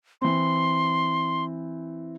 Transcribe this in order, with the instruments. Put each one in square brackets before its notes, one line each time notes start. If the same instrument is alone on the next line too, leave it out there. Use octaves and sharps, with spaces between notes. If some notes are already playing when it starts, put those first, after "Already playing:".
[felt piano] E3 C4 [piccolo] C6